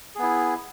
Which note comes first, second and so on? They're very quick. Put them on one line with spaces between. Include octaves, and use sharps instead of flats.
G#4 B3 E4